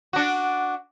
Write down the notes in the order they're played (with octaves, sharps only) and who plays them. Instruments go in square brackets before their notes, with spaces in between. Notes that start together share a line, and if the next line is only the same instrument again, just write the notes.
[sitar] D4 F#4